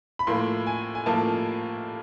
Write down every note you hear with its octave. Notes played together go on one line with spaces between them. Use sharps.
B5
A2 F3 A#3 C6
G#5
G#5
A2 F3 A#3 A5